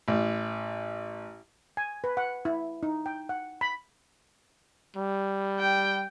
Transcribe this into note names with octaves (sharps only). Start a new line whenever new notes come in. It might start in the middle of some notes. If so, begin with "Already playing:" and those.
A1
G#5
B4
F#5
E4
D#4
G5
F#5
B5
G3
G5